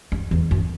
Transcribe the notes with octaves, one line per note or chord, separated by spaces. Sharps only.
G2
E2
F#2